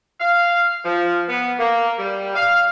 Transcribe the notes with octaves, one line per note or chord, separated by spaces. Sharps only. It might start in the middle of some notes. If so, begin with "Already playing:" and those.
F5
F3
B3
A#3
G3
F5